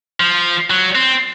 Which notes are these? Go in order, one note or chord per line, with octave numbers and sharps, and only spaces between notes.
F3
F#3
C4